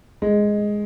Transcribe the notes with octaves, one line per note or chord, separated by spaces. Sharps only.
G#3